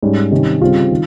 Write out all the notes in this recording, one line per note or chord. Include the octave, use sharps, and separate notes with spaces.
G#2 G3 C#4
C3 D#3 G3 C#4
C#3 G3 C4 F4
D#3